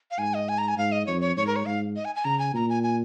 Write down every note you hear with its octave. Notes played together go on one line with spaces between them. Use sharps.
F5
G#2 G#5
D#5
G#5
A#5
G#5
G#2 F5
D#5
F2 C#5
C#5
G#2 C#5
A#4
C#5
G#2 F5
D#5
G#5
G#5
C#3 A#5
G#5
A#2 A#5
G#5
G#5